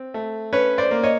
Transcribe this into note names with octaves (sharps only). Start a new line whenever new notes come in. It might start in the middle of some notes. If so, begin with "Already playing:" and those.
Already playing: C4
A3
C#4 B4 C#5
C5 D5
A#3
C#5 D#5